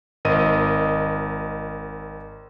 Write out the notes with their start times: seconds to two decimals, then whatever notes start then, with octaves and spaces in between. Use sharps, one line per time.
0.25 G#1 A#4 D#5 D#7